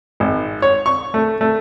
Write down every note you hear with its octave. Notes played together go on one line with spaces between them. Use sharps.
G#1
C#5
C#6
A3
A3